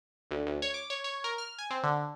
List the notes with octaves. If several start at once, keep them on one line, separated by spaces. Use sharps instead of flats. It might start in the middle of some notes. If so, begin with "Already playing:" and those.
D2
D2
C#5
D6
C#5
C#5
A#4
F6
G#5
C4
D3